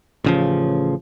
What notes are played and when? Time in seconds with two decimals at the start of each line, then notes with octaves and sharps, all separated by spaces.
0.24 A1 C#3 F3